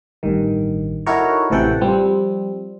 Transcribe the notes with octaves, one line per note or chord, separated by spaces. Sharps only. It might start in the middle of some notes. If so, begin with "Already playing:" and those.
A1 G2 D#3
D#4 E4 F#4 A4 A#4 C#5
A1 C3 E3 A4 F#5 G5
F3 G3 C4